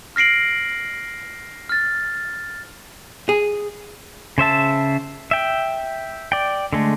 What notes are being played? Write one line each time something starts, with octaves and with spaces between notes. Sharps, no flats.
F6 A#6 C7 D7 F#7
F6 A6
G#4
C#3 C5 E5 A5
E5 G5
D5 G5
D3 G#3 A3